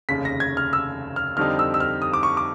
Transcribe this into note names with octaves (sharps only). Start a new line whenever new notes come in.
F1 D#2 C#3 B6
A#6
G#6
F6
E6
F6
F2 D3 G3 C4 D#4 F6
E6
E6
F6
D#6
D6
C#6
D6